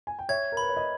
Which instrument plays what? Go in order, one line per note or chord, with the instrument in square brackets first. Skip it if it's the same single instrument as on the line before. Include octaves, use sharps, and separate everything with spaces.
[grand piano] G#5
G5
[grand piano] C#5 E5 [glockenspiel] G#6
[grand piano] A#4
[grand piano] B4 [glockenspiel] B5
[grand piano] C#5
D#5